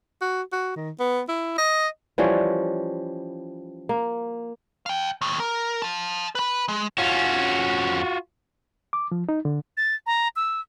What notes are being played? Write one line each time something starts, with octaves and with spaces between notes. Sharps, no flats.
F#4
F#4
D#3
B3
E4
D#5
E3 F3 G3 C#4
A#3
F5 G5
D#2 A2
A#4
F5 A5
B4 B5
G#3
F2 C#4 F4 F#4
D6
F3
D#4
D3
A6
A#5
E6